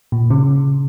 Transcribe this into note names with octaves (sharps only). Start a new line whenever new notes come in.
A#2
C#3